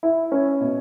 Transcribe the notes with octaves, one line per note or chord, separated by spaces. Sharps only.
E4
C#4
B2